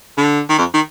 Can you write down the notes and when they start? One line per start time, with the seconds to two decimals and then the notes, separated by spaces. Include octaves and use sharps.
0.18 D3
0.49 D#3
0.58 F2
0.74 D#3